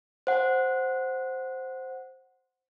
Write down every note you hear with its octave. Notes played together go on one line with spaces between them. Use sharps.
C5 F#5